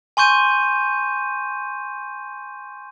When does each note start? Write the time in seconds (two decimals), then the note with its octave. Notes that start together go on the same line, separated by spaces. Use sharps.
0.17 G#5 C6 C#6 G6 D#7